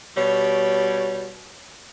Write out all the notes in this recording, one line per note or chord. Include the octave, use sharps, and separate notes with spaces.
B2 G3 C#5